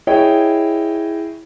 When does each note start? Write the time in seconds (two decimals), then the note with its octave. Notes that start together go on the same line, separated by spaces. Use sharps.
0.07 E4 G#4 C#5 D#5 G5